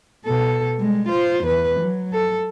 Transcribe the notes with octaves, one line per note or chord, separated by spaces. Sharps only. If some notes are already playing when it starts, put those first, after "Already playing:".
B2 A4
G3 G#3
F4 C5
E2 B4
F#3
A4